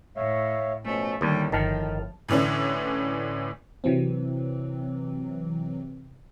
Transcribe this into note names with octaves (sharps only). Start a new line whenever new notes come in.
A2 C#5 E5 F5
B2 F3 A3 C#4
D#2 A2 D3 G3
G1 D#3 F3 A5 F6
A2 D3 E3 C#4 D4
C3 E3 F#3 C4